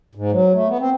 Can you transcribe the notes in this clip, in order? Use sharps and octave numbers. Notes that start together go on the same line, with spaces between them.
G#2
F#3
A3
B3
C4